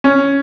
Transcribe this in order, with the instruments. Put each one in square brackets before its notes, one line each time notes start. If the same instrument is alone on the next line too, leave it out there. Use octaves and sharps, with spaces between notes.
[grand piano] C#4